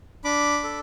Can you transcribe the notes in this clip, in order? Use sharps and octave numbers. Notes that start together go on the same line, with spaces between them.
D4 B5 D6
A4